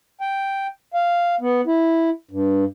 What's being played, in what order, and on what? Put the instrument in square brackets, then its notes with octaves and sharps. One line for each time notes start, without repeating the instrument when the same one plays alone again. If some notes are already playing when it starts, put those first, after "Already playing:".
[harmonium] G5
F5
B3
E4
G2